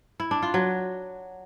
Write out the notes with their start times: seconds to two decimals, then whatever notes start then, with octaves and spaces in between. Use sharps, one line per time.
0.20 E4
0.31 D4
0.42 F4
0.54 F#3